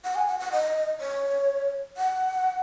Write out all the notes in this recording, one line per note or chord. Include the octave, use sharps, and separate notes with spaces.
F#5
G#5
F#5
F#5
D#5
C#5
F#5